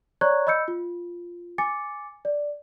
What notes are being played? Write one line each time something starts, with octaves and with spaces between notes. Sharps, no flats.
C#5 D5 A#5 C#6 F#6 G#6
D#5 B5 E6 G6 C#7
F4
G#5 D6 A6 C#7
D5